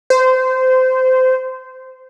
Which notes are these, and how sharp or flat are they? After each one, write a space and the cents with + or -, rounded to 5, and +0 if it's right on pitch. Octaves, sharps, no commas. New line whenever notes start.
C5 -20